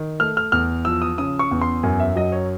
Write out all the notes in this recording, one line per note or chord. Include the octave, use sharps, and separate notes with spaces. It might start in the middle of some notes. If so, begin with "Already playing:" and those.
Already playing: D#3
A3 F6
F6
E2 F6
F3 E6
D#6
C#3 D#6
C#6
E2
C6
F#2 G#5
E5
F#3 D#5
C#5